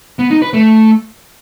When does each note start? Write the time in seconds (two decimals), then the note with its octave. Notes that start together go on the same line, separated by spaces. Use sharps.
0.19 B3
0.30 D#4
0.42 B4
0.54 A3